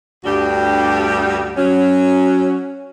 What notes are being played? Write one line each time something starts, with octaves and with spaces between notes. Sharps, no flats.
D2 G2 G3 F#4 G4
F#3 C#4